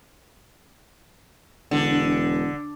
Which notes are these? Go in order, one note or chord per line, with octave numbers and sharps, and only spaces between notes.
E1 D3